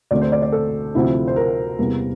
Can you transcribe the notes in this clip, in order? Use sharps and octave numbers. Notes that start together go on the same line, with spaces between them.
D2 D3 A3 C4 D5
C5
D5
D5
A4
D2 C3 F3 C4 E4
C5
A#4
E2 C3 G3 A#3